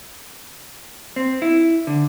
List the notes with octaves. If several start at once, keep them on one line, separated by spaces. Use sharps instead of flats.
C4
E4
D3